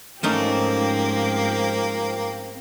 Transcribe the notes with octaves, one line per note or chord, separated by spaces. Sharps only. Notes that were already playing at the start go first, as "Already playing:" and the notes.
G#2 F3 A3 A#3 C4 C#4 D#4 G4